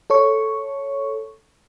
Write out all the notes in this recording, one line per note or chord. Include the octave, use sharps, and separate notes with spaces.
A4 C#5 C#6